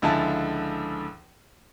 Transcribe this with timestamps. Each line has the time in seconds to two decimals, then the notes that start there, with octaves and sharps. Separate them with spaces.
0.02 C#2 D3 F3 E4 G#5 A5